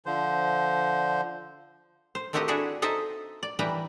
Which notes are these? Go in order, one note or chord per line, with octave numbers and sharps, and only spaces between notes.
D3 F3 C5
C5
D#3 A3 C4 F#4 G4 D#5
D4 E4 F#4 G#4 A4
D#4 A4 C5 D#5 E5
D5
E3 G3 B4 G5 A#5